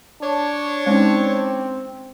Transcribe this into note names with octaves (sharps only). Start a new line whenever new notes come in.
D4 C#5
G#3 C4 C#4 D#4